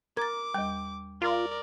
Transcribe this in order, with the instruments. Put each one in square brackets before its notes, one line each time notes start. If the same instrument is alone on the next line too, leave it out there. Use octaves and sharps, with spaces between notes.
[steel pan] A#4 [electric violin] D6 [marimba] G#6 A6
[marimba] D#2 G3 [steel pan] G5
[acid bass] F4 [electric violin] A#4 D5